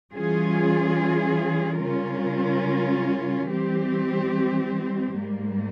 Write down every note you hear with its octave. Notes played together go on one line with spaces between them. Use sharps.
E3 G3 C#4 F4 G#4
C#3 G3 C#4 F4 A#4
E3 G3 C4 G4
G#2 G3 A#3